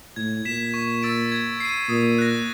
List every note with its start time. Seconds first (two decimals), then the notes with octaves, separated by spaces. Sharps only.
0.16 A2 G#6
0.45 A#2 B6 E7
0.74 C#6
1.03 E6 A6 D7
1.32 G#6
1.60 C7 D#7
1.89 A#2 D#6
2.18 F#6 A#6